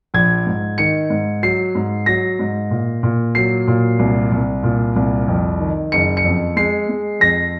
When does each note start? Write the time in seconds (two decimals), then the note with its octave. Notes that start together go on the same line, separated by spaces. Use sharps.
0.14 A#1 G#6
0.46 G#2
0.78 D#3 C#7
1.10 G#2
1.43 F#3 C7
1.75 G#2
2.06 F#3 A#6
2.39 G#2
2.71 A#2
3.03 A#2
3.35 F#3 C7
3.67 A#2
3.99 C2
4.32 C2
4.63 A#2
4.96 C2
5.28 F2
5.60 D#3
5.92 F#1 C#7
6.17 C#7
6.24 F2
6.56 G#3 C7
6.89 G#3
7.20 F2 A#6